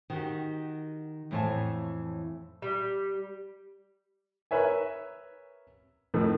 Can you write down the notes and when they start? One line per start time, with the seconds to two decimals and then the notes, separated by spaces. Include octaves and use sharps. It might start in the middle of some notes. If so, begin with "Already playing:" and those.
0.10 D#3 F#4 G4
1.31 F2 A2 E3 C#5 F5 A5
2.62 G3
4.51 A#4 B4 C#5 E5 G#5
6.14 F2 A2 D#3 A3